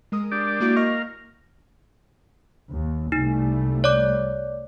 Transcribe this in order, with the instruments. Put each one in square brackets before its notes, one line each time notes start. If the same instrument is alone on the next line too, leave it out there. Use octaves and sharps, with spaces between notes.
[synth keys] G#3 A#4 D#6
[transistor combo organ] D4 G4 D5
[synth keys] A#3 E4 F#4
[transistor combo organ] A#4 F5 [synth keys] D#5 C#6
[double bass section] D#2
[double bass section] C2 G3 A3 [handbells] D#4
[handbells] C#5 D5 D6